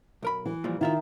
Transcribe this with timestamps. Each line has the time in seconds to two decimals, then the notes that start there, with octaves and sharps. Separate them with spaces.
0.23 B1 A#4 B5
0.45 E3
0.64 A#2 F3 G3
0.81 C#2 D#3 E4 F4 E5